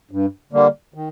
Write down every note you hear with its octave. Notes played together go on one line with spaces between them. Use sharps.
G2
D3 G3 A#3
D#3